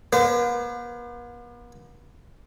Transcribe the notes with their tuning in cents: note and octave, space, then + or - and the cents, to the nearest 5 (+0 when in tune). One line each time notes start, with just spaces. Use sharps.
B3 -45 C5 -45